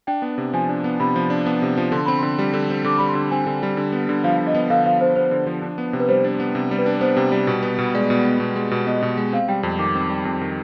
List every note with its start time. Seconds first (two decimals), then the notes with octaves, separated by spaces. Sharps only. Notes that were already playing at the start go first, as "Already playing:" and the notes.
0.07 D4 G5
0.22 B3
0.38 C3
0.53 F3 G#5
0.69 D4
0.84 B3
1.00 C3 B5
1.16 F3
1.30 D4
1.46 B3
1.62 C3
1.78 F3
1.92 D3 C6
2.05 C4 B5
2.18 D3 C6
2.39 G3
2.54 D3
2.70 C4
2.84 D3 D6
2.98 G3 B5
3.08 C6
3.15 D3
3.31 C4 G#5
3.46 D3
3.63 G3
3.77 D3
3.93 B3
4.09 D3
4.24 F3 F5
4.39 D3
4.47 D#5
4.54 B3
4.70 D3 F5
4.86 F3 F5
5.01 D3 C5
5.16 B3 C5
5.31 D3
5.47 F3
5.62 D4
5.78 B3
5.93 C3
6.00 B4
6.09 G3 C5
6.24 D4
6.40 B3
6.55 C3
6.71 G3
6.79 B4
6.86 D4
7.01 B3 C5
7.17 C3
7.32 G3
7.47 B2
7.63 B3
7.79 B2
7.94 G#3 D5
8.10 B2
8.25 B3
8.40 B2
8.56 G#3
8.71 B2
8.87 B3 D#5
9.02 B2
9.17 G#3
9.33 C4 F5
9.48 G3 G5
9.63 F2
9.79 D#3 D6
9.95 C4
10.10 G3
10.25 F2
10.42 D#3